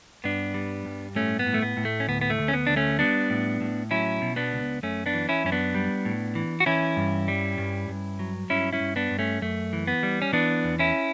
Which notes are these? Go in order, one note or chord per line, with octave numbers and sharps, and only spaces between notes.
G2 B3 D4
G3
G2
A2 A3 C#4
B3
A2
A3
B3
A2
A3
C#4
D2 B3
B3
A3
D2
C#4
B3
D2 D4
A3 C#4
G3 B3 D4
A2
A2
F#3 C#4 E4
B2
B3 D4
C#2
F#2 A3 C#4
B3 D4
E3
C#4 E4
F#2 C#4
B3 D4
G3
A2
E3
F#4
E3 C#4 E4
G2
G3
G2
G2
F#3
G2 C#4 E4
C#4 E4
G2
B3 D4
G2
A3 C#4
F#2 A3
E3
B3
G3
C#4
E3 B3 D4
E2
C#4 E4